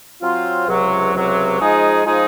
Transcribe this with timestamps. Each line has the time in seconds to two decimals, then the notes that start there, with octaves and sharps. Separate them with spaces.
0.22 F#3 C4 F4
0.67 C#2 C3 F#3
1.14 C#2 C3 F#3
1.60 F3 G#3 D#4 G#4
2.06 F3 G#3 D#4 G#4